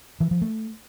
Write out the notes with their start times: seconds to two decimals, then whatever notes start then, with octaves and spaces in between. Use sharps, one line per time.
0.20 E3
0.31 F3
0.42 A3